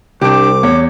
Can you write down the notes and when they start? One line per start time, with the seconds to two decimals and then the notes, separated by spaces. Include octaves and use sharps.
0.21 C2 D4 G4 D6
0.63 E2 C#5